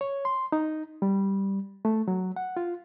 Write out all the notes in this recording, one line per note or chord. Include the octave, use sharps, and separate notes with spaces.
C#5
C6
D#4
G3
A3
F#3
F#5
F4